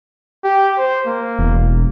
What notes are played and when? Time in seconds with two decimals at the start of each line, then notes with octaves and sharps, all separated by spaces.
0.44 G4
0.78 C5
1.07 A#3
1.39 E1